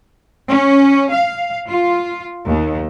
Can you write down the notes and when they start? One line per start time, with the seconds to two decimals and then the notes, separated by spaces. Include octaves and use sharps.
0.50 C#4
1.12 F5
1.66 F4
2.48 D#2